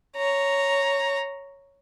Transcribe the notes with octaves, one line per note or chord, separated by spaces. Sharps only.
C#5 A#5